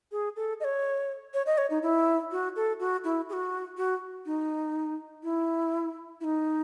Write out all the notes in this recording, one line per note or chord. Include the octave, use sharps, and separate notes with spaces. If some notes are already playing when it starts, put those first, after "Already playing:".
G#4
A4
D#5
C#5
C#5
D#5
C#5
D#4
E4
F#4
A4
F#4
E4
G#4
F#4
F#4
D#4
E4
E4
D#4